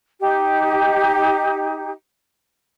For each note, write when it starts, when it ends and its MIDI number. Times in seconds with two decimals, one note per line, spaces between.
0.19 1.90 63
0.19 1.90 67